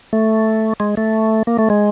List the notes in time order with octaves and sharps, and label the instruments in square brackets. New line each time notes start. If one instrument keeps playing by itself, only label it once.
[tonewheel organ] A3
G#3
A3
A#3
A3
G#3